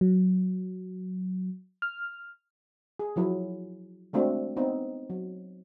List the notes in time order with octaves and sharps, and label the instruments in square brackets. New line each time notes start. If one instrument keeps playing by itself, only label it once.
[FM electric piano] F#3
F6
[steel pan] G#4
F3 F#3 E4
G#3 A3 C4 D4 F#4
B3 C4 D#4
F#3